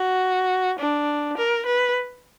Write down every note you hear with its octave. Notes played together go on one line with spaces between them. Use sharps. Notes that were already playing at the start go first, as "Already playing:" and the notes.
Already playing: F#4
D4
A#4
B4